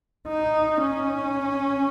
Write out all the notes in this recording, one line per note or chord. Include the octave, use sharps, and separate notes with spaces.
D#4
C#4